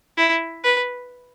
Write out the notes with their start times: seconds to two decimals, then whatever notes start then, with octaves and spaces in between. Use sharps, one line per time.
0.17 E4
0.64 B4